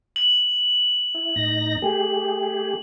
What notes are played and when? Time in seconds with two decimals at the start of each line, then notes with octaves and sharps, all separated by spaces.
0.16 F#7
1.14 E4
1.36 A2 D#4 A#6
1.82 A3 G4 G#4